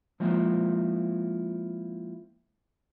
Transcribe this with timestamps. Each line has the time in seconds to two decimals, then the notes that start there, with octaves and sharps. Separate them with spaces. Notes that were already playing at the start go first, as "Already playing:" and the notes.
0.20 F3 G#3 A#3 C4 E4 F4